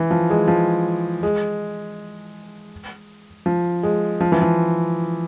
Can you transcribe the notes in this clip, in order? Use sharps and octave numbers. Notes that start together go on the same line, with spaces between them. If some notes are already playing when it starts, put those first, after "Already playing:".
Already playing: E3
F3
G#3
F3
G#3
F3
G#3
F3
E3
F3